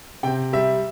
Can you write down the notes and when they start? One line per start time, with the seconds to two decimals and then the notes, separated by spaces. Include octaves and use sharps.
0.23 C3 G5
0.53 G3 E5